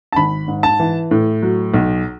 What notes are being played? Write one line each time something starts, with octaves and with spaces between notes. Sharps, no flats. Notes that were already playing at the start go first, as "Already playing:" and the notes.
A5
G#1 B5
G#2
A5
E3
A2
F#3
B1